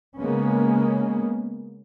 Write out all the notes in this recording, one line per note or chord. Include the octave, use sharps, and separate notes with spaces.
C#3 G#3 A#3 B3 C#4